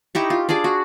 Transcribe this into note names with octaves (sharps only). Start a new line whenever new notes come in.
D#4 E4 G4 C#6
F4
D4 F4 G#4 D5
F#4